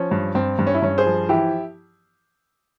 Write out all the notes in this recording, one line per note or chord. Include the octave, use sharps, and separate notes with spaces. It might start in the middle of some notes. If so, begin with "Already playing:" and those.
Already playing: F3 C#4
G2
G2 C4
G2
C#4
E4
G2 C#4
G#4 C5
F3
E3 E4 G4